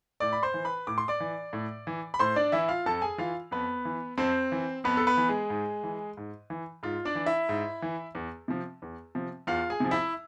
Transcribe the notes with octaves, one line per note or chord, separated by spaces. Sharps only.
A2 D5 D6
B5
C5 C6
E3
B4 B5
A2 D6
C6
D5 D6
E3
A2
E3
B5
A2 C5 C6
D4 D5
E3 E4 E5
F4 F5
F2 A4 A5
G#4 G#5
E3 F4 F5
F2 B3 B4
E3
F2 C4 C5
E3
F2 B3 B4
A4
B3 B4
E3
G#3 G#4
G#2
E3
G#2
E3
G#2 F4
D4 D5
E3
E4 E5
G#2
E3
E2
C3 F3
E2
C3 F3
E2 F4 F5
G#4 G#5
C3 F3
E4 E5